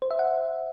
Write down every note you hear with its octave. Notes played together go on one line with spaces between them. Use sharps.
C5
E5
F#5